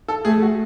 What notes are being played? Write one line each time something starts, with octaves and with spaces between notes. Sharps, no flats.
A4
A3 G#4
F#4